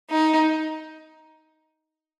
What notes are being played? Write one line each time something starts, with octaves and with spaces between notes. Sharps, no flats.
D#4